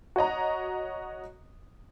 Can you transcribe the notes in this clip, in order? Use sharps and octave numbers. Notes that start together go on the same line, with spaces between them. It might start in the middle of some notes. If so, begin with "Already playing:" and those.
F#4 C#5 D#5 A#5